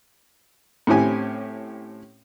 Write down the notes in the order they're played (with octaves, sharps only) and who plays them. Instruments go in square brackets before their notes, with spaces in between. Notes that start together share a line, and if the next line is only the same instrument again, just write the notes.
[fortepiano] A2 C4 C#4 E4 G4 G#5